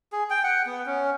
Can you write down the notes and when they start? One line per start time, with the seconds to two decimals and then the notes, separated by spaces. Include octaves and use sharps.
0.12 G#4
0.30 G5
0.44 F#5
0.66 B3
0.86 C#4